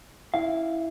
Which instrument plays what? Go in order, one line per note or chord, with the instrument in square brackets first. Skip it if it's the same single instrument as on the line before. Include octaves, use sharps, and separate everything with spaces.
[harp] E4 [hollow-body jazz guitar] F5